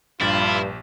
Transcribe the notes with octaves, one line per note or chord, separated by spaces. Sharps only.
A#1 G2 E4 F4 G4 A6